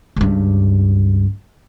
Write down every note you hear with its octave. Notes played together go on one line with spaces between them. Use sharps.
C#2 G2